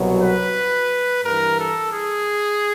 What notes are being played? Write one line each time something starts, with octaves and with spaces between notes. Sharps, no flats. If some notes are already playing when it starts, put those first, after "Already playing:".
Already playing: C2 B2 F#3
B4
G2 E3 A#4
A4
G#4